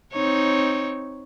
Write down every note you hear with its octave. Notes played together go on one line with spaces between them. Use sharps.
C4 D#4 C#5